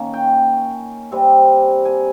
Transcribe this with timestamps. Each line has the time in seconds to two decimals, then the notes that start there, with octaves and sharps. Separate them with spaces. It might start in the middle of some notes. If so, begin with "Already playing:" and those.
Already playing: D#3 A#3 C#4
0.14 G5
1.12 C3 G3 C4
1.85 G#5